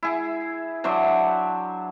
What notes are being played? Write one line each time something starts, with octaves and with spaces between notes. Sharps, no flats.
E4 G#4
F#3 D4 C5 E5